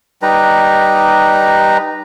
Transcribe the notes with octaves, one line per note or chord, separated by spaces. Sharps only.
G3 D#4 B4 A#5